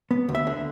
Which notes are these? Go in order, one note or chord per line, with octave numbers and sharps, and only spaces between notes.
B3
D2
E5
D3